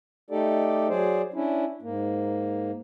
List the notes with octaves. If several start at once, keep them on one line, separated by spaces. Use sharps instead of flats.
A3 D#4 G4 A4 D5
F#3 G#4 C5 D5
C#4 D4 E4
G#2 A#3